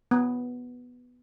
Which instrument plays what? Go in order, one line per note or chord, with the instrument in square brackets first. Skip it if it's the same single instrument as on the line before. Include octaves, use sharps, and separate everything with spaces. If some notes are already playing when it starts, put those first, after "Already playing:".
[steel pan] B3